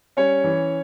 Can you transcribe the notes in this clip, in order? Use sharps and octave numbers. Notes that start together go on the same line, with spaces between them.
G3 C#4 C#5
E3